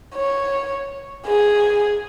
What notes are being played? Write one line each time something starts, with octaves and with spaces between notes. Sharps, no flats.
C#5
G#4